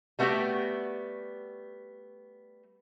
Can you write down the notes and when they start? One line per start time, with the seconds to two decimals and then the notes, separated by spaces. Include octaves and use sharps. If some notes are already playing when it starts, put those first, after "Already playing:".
0.19 G3 A3 B3 C4 F#4 G4